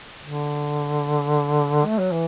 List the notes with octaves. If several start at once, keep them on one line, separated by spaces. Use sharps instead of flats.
D3
A3
F#3
E3